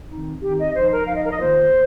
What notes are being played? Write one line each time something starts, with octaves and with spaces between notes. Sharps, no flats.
D#3 C4 D#4
D#3 C4 D#4 G4
D#5
F3 D#4 C5
A#4
F3 D#4 F5
D#5
A#4
D#5
D#3 A#3 F4 C5